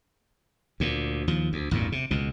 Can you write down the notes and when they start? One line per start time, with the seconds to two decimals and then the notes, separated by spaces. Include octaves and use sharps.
0.80 D2 A#2
1.28 D#2 F3
1.53 D2
1.71 A1 E2 G2 A#2
1.92 C3
2.11 C#2 B2